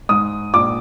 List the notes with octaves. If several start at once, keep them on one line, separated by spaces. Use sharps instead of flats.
G#2 D#6
A#1 D6